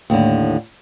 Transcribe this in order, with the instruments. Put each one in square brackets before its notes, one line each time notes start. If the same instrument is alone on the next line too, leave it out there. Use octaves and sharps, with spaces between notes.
[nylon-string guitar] D#2 A2 D3